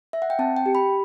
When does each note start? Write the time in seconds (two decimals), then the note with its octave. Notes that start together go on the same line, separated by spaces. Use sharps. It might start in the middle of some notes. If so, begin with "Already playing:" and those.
0.13 E5
0.22 F#5
0.30 G5
0.39 C4 A5
0.56 G5
0.66 G4
0.75 B5